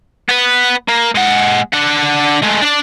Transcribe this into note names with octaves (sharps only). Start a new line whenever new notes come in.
B3 B4
A#3
G#3 F#5
D4 F#5
G#3 A3
D4 D5